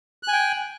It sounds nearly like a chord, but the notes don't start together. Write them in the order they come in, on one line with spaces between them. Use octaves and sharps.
F#6 G#5 G5